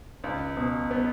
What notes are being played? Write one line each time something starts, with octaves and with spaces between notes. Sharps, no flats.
C#2
B2
B3